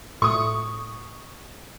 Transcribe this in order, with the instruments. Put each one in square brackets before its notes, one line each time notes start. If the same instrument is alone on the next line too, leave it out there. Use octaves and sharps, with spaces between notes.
[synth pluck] A2 [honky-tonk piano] C#6 D#6